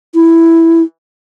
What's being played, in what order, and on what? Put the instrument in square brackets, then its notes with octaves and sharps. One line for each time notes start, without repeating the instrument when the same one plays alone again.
[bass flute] E4